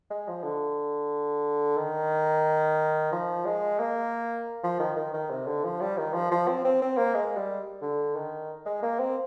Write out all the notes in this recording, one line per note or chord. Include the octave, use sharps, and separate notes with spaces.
G#3
F3
D3
D#3
F3
G#3
A#3
F3
D#3
D#3
D#3
C3
D3
F3
G3
D#3
F3
F3
C4
C4
C4
A#3
G#3
G3
D3
D#3
G#3
A#3
C4